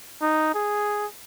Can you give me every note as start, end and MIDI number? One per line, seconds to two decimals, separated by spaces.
0.22 0.53 63
0.54 1.06 68